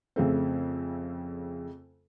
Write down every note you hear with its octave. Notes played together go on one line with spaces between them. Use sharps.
F2 C#3 A3 C4